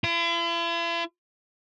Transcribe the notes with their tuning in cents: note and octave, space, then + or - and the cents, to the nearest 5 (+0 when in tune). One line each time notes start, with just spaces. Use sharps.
E4 +45